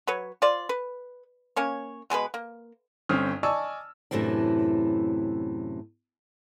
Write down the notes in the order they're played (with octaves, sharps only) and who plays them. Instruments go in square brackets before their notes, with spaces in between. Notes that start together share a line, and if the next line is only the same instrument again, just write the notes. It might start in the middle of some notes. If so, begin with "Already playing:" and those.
[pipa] F#3 B4 C#5
F4 C5 D5
B4
A#3 C#4 C#5
B2 G#3 D4 B4
A#3
[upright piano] G1 C4 C#4 D#6 F6
D5 D#5 G#5 A5 C#6 E6
[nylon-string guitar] F#2 A2 C3 E3 D4